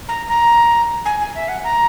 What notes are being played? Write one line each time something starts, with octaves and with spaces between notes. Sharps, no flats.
A#5
A#5
G#5
G#5
E5
F#5
A#5